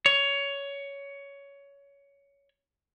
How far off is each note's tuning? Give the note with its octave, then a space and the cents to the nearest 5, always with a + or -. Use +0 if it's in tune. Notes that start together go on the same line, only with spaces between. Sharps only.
C#5 +15